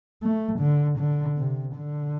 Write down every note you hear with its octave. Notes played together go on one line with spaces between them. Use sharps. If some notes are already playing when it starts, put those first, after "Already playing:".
A3
D3
D3
C3
D3